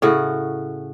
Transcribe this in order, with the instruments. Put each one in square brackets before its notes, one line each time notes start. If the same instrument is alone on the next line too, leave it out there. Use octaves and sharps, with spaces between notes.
[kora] A2 C#3 F#4